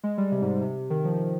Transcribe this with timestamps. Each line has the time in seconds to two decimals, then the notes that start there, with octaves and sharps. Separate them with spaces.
0.04 G#3
0.18 G3
0.32 C3
0.41 G#2
0.62 C3
0.90 D#3
1.05 F3